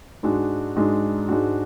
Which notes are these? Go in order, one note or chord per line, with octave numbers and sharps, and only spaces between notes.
G#2 G#3 D4 F#4
G#2 G#3 D4 F#4
G#2 G#3 D4 F#4